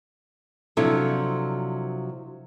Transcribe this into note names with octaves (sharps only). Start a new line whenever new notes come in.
C3 F3 F#3 D4 E4 A4